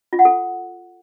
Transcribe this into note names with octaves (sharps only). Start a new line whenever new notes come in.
F4
F#5
A4